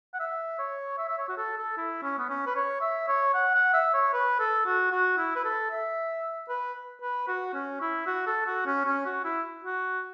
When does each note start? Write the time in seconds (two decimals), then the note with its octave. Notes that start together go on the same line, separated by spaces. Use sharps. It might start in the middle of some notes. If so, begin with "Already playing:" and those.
0.14 F#5
0.20 E5
0.59 C#5
0.98 E5
1.08 E5
1.17 C#5
1.29 F#4
1.37 A4
1.58 A4
1.77 E4
2.02 C#4
2.19 B3
2.29 C#4
2.46 B4
2.56 C#5
2.81 E5
3.08 C#5
3.34 F#5
3.54 F#5
3.74 E5
3.94 C#5
4.13 B4
4.39 A4
4.65 F#4
4.92 F#4
5.17 E4
5.36 B4
5.45 A4
5.71 E5
6.49 B4
7.01 B4
7.28 F#4
7.54 C#4
7.81 E4
8.07 F#4
8.26 A4
8.46 F#4
8.66 C#4
8.86 C#4
9.06 F#4
9.24 E4
9.64 F#4